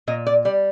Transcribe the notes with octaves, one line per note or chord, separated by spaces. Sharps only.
A#2 D#5
D5
G3 D5